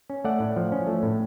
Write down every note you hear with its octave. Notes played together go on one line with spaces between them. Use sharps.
C#4
A3 D5 F#5
A2
F3
C#4
A3
A2